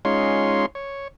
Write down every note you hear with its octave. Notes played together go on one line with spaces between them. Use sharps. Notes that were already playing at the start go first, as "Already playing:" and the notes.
G#3 C#4 D#4 F4 C#5 C6
C#5